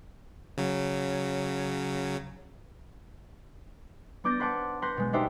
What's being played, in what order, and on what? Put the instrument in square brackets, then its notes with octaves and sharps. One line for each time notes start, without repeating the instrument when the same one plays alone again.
[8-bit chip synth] C#3 F#3
[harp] B3 D4 D6 G6 A6 A#6
B4 C5 F#5 A5 D6
B4 F#5 C6 G6 A#6
B2 G#3
D4 D#4 F#4 G4 C5 E5